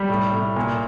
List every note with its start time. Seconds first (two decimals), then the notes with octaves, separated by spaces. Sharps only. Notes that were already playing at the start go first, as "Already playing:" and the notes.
Already playing: G3
0.09 A2
0.33 A2
0.56 A#2